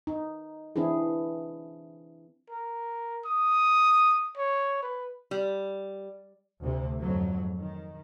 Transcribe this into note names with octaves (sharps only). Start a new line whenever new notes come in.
D#4
E3 C4 D4 E4 G#4
A#4
D#6
C#5
B4
G3
D2 C3
F2 G#2 F#3
D#3